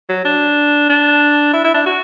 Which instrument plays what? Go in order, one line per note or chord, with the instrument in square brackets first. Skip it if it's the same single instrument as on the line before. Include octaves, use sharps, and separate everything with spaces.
[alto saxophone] F#3
D4
D4
E4
E4
D4
F#4